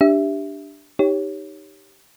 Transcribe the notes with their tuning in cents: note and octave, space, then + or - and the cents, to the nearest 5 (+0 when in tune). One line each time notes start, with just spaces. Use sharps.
D4 +0 G4 +0 E5 +0
D#4 +0 G4 +0 C#5 +0